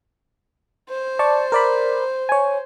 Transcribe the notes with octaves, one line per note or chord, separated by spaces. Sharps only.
C5
D5 A5 C#6
A#4 D5 B5
C#5 G#5